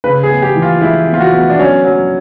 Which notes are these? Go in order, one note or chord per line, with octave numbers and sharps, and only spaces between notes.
C#3 B4
G#4
B3
G4
E3
F4
G#3 E4
B3
F4
F#4
B3
D4
F#3 C#4
F#3